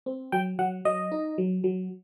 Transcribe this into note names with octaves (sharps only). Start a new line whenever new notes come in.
C4
F#3 G5
F#3 F#5
F#3 D#5
D#4
F#3
F#3